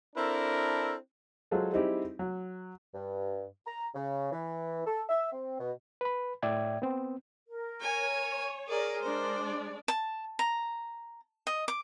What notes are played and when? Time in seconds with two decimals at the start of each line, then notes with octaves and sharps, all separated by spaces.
0.16 C4 D4 E4 A4 A#4
1.51 F#3 G#3 F4 G#4 A4 C5
1.73 G3 C4 D#4 E4 G4 G#4
2.19 F#3
2.94 G2
3.67 A#5
3.95 C#3
4.32 E3
4.86 A4
5.09 E5
5.32 C4
5.59 B2
6.01 B4 B5
6.42 A2 D5 E5 G5 G#6
6.82 B3 C4
7.47 A#4
7.81 C#5 G#5
8.68 G#4 A#4 D5
9.02 G#3 D4 C5 D5
9.88 A5
10.39 A#5
11.47 D#5
11.68 D6